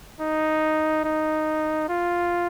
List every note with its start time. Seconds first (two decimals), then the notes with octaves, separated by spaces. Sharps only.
0.20 D#4
1.04 D#4
1.89 F4